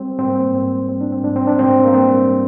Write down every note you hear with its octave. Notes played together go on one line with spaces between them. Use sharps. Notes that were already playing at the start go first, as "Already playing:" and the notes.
Already playing: G3 C4
G#2 C4
A#3
C4
G#2 C4
G3 C4
D4
C4
G#2 D4
C4
D4
G#2 C4
A#3
G3 C4